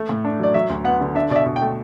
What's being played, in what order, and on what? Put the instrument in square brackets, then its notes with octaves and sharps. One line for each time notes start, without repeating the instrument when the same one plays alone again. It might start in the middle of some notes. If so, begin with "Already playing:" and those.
Already playing: [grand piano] A3
A2
D4
[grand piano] F#3 [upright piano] D5
[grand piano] F#3 [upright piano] E5
[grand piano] D2
[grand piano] B3 [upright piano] F#5
[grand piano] D3
[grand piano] D4 [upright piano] E5
[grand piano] B2 [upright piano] D5
[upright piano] E5
[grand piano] B2
[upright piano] G5
[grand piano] A3